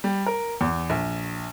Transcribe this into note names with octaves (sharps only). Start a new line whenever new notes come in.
G3
A#4
E2
A#1